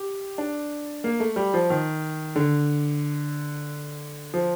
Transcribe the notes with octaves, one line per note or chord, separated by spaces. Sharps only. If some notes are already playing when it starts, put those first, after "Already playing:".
Already playing: G4
D4
A#3
A3
G3
F3
D#3
D3
F3